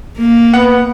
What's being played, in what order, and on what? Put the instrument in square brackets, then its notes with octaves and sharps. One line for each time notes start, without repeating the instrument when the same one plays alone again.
[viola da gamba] A#3
[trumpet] B3 [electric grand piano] F#5